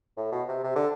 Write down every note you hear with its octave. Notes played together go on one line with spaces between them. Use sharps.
A2
B2
C3
C3
D3